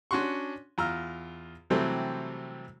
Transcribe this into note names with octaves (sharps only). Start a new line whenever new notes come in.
C#4 D4 F#4 F#5 C6 C#6
E2 F4 A#5 E6 F6
C3 E3 F#3 G3 A3 C4